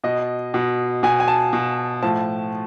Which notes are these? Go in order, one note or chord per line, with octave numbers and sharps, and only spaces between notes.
B2 D#5
B2
B2 G#5
G#5
A5
B2
A2 F3 A5